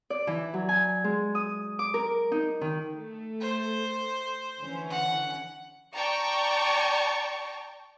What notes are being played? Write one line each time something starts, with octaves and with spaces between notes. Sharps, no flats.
D5
E3
F#3
G#5
G#3
D#6
D6
A#4
D#4
D#3
A3
C5
D3 E3 C#4
F#5
D5 G5 A5 A#5 C#6